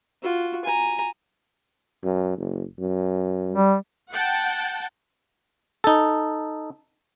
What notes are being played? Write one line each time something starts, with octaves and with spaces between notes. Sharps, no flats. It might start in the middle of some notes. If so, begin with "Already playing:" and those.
F4 F#4
G#5 A#5
F#2
F#1
F#2
G3
F#5 G5 A5
D#4 A4